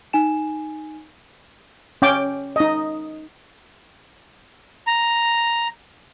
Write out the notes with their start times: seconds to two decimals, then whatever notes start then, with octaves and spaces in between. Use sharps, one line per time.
0.13 D#4 G#5 E7
2.02 C#4 G5 D6
2.56 D#4 D#5
4.87 A#5